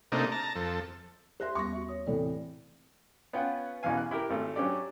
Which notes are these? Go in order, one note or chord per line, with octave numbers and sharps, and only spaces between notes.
C3 A3 A#3 D4 D#4
A5 A#5
F2 A4
G4 C5 E5 C6 F#6 A#6
D#2 G3 B3 C#6 A#6
F#4 E5
C#5 D#6
A2 C3 E3 A4 D5
B3 C#4 F4 B4 F#5 G5
A1 E2 B2 E3 F5 G#5
F#6
E4 G4 A#4
G#1 A3
F#3 C#4 D4 G4 D5